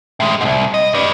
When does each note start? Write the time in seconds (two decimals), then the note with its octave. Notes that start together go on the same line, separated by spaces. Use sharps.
0.20 A2 G#3
0.41 C2 G#2
0.74 D#5
0.94 B4 D5